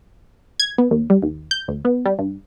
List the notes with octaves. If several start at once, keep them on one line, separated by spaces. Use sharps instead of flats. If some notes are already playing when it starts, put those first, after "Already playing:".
G#6
B3
D#2
G3
D#2
G6
D2
B3
G3
G2